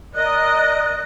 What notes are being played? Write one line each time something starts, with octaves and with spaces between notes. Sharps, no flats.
A#4 D5 D#5 F#6